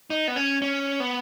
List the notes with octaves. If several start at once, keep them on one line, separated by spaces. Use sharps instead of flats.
D#4
B3
C#4
C#4
B3